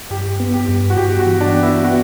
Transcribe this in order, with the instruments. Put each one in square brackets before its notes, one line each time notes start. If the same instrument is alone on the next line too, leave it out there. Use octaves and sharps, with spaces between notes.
[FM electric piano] G2 [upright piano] G4
[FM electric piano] B3
[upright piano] G4
[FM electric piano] G2
[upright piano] F#4
[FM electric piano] G2 [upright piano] G4
[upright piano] F#4
[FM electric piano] E3
[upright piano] D4
[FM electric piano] B3
[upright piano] E4
[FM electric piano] B3 [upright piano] F#4